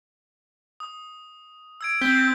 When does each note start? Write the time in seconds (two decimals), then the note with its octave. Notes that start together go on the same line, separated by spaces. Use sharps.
0.80 D#6
1.81 E6 G#6 D7
2.01 C4 G6 B6 G7